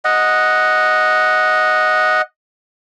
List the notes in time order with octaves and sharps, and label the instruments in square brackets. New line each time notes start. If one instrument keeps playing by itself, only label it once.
[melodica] D#5 F#5